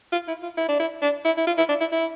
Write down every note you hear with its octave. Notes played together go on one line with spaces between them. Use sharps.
F4
E4
F4
E4
D4
E4
D4
E4
E4
F4
E4
D4
E4
E4